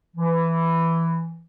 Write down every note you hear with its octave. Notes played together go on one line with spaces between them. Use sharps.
E3